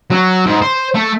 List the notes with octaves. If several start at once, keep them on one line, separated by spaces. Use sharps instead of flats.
F#3
G#2
C5
A3